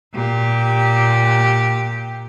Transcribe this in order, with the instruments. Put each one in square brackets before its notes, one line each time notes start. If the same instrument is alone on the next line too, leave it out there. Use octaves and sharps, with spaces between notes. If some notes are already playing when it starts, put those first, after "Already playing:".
[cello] A#2 G4